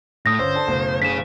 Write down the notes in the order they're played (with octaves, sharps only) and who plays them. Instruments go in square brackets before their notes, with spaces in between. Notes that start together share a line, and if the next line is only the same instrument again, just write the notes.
[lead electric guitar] A2 [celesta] D#6 A#6
[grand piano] G1 C#4 E6 [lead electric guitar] C5
[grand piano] D4 A4 A5
F#1 B2 A3
[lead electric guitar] C#3 G#4 [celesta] B6 E7